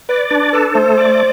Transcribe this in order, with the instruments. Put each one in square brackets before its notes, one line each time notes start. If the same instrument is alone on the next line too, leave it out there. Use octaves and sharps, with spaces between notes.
[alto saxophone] B4 [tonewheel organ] D5
[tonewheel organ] D4 [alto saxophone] B4
[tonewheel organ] A4 [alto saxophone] B4
[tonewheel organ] A3 [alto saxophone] C5
[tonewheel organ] D5